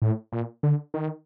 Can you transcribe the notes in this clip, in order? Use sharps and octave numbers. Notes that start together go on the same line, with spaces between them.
A2
A#2
D3
D#3